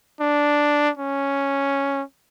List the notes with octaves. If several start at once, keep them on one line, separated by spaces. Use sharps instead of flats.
D4
C#4